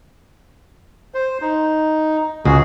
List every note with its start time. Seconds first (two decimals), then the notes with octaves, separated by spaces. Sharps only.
1.14 C5
1.41 D#4
2.45 C#2 F#4 G#4